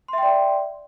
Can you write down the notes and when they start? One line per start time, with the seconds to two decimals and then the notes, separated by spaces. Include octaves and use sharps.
0.08 C6
0.13 E5
0.18 G5
0.23 D5